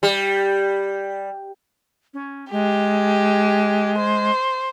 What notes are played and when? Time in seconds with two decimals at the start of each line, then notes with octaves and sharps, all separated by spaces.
0.03 G3
2.14 C#4
2.51 G#3 G4
3.98 C5